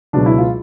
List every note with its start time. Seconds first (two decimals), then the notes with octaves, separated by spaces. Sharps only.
0.13 C#2 B2 F#3 D4
0.26 E4
0.38 F4